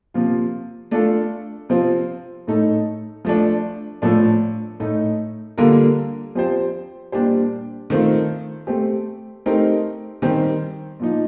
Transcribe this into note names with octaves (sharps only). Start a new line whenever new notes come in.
C3 F3 A#3 F4
A3 D4 F4 A4
C3 F3 C4 F4
A2 A3 D#4 A4
F3 A3 D4
A2 F3 A3 D4 A4
A2 A3 D#4
D3 G3 A#3 F4 A#4
F3 C4 G4 C5
A#2 G3 D4 G4 C5
D#3 A3 C4 F4
A3 C4 G4
A3 C4 D#4 G4 A#4
D#3 G3 C4 G4
A#2 F3 A#3 D#4